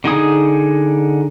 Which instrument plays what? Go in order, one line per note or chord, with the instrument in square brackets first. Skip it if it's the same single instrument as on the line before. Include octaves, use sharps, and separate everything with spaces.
[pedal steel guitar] D3 D#4 G#4 D#6